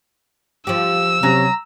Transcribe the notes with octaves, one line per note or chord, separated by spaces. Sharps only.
F3 G4 E6
C3 F#3 C#4 A#5